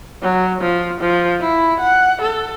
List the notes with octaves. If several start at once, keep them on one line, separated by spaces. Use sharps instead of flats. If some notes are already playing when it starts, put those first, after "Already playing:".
F#3
F3
F3
E4
F#5
A4